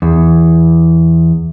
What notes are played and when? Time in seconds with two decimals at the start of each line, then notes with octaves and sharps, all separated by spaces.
0.02 E2